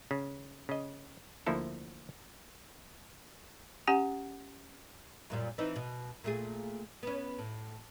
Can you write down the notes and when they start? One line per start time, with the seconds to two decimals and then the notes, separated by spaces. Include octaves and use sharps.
0.11 C#3
0.69 C#3 D#5
1.47 D2 F3 A#3 E4 A4
3.87 C#4 G4 F#5 G#5
5.30 F#2 A#2 G3
5.58 E3 C4 D#4
5.76 B2
6.24 A#2 A3 G#4
7.03 B3 C#4
7.39 A2